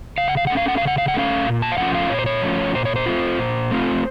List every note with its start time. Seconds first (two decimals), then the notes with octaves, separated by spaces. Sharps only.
0.18 C#3 F5
0.28 F#5
0.37 F5
0.47 A3 C#4 F#5
0.57 F5
0.68 F#5
0.78 C#3 F5
0.87 F#5
0.98 F5
1.08 F#5
1.14 A3 C#4 F5
1.45 A#2
1.62 A5
1.72 F5
1.77 F3 A3 C#4 F4 F#5
1.95 F5
2.10 A#2 C#5
2.19 C5
2.26 C#5
2.42 F3 A3 C#4 F4
2.75 A#2 C5
2.85 C#5
2.96 C5
3.06 A3 C4 F4
3.39 A#2
3.71 A3 C4 F4